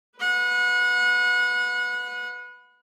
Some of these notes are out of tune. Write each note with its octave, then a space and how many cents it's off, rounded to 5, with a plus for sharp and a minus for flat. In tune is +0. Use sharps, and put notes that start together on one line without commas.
B4 +5 F#5 -30